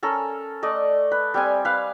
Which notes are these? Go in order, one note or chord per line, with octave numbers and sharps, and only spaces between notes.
C#4 A4 A#4
A3 D5 D#5
B4
G3 C4 G#5
B4 F5